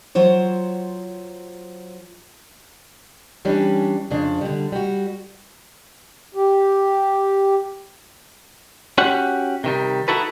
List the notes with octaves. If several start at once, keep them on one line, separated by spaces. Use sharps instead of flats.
F#3 F4 C5 C#5
E3 G3 C#4 D4 G4
F2 C#3 D4
D3 G3
G3 F#4
G4
C#4 F#4 G4 F#5
C3 D#3 G3
D#4 E4 F#4 A4 B4